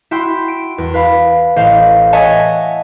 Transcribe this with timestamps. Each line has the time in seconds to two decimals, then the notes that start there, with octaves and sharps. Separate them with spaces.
0.11 E4 F#4 G5 C6
0.48 D7
0.78 E2
0.94 B4 F5 B5
1.56 A1 C5 D#5 F5
2.13 C#5 D#5 E5 F#5 G#5 A5